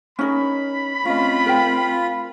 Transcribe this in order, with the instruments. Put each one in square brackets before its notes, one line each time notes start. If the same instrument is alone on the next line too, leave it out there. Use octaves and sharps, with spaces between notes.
[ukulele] C#4 D#4 A#4 [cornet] B5
[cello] A3 C4 [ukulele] C#4 D#5 [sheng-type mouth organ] F4
[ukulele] A#4 G5